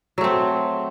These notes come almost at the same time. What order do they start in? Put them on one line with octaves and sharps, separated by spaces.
F#3 A3 C4